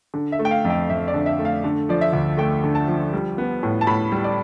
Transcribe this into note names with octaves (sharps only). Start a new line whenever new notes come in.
D3
E5
A3
G5
F5
F2
G5
F2 E5
D5
D3
E5
A3
F5
D3
F3 D5
E5
D2
A3 G5
D3
A5
F3
G3
B3
A2
A5
A2 B5
G3
D5